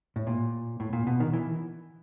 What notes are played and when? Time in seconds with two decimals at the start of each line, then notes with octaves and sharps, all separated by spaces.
0.16 A2
0.27 A#2
0.80 A2
0.93 A#2
1.07 B2
1.20 D#3
1.33 E3